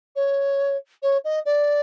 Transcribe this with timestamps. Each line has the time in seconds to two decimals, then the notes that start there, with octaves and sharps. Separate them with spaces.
0.15 C#5
1.02 C#5
1.24 D#5
1.45 D5